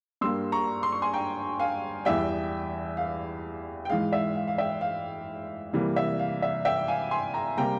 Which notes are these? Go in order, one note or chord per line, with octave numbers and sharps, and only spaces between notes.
G2 G3 A#3 C6 E6
A#5 C#6
C6
C#6
G#5 C6
G5 A#5
F5 G#5
E2 E3 G3 E5 G5
F5
G5
G#2 E3 G#3 F5
E5
F5
F5
E5 G5
F5
C3 E3 G3 A#3
E5
F5
E5
E5 G5
F5 G#5
G#5 C6
G5 A#5
C3 G3 A#3 G5 A#5